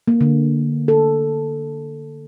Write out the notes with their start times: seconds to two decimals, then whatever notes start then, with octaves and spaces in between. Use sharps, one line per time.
0.08 A#3
0.21 D3
0.88 A4